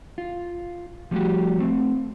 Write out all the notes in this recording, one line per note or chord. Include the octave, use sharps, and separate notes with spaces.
F4
F3 G3 A3 B3 F#4 G4
A3 C4